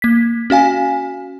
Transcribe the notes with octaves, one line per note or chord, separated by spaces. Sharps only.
A#3 B6
C#4 F#4 F5 G#5